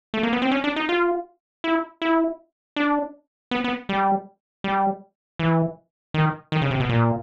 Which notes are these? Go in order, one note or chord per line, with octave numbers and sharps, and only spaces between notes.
A3
A#3
B3
C4
C#4
D4
D#4
F4
E4
E4
D4
B3
B3
G3
G3
E3
D#3
D#3
C#3
C3
B2
A#2